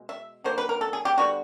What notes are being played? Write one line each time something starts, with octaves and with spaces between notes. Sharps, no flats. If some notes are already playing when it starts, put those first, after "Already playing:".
Already playing: B2 G#3
E5
D3 F#3 A#3 C5
B4
A#4
A4
G#4
G4
D3 G3 B3 F#4